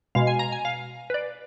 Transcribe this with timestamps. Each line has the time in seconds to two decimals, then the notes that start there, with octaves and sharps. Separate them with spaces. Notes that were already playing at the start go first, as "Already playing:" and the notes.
0.15 B2 G#3 F5
0.27 G#5
0.39 A#5
0.52 G#5
0.65 F5
1.10 B4
1.14 D5